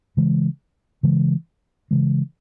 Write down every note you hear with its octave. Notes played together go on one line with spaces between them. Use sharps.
C#3 E3 G#3
C#3 E3 G#3
C#3 E3 G#3